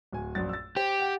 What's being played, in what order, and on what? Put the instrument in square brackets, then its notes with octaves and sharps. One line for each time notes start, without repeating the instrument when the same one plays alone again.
[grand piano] D1 G#5
A#1 F#2 A6
E6 A6
[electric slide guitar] G4 [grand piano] C5
[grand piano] F#5 G5